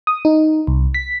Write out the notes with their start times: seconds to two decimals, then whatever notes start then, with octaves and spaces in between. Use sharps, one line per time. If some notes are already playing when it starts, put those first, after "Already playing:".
0.07 D#6
0.25 D#4
0.67 C2
0.94 B6